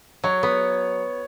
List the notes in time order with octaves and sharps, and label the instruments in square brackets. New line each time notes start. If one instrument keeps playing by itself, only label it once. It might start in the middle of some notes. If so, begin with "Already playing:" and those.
[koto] F#3 [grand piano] C#5
[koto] B3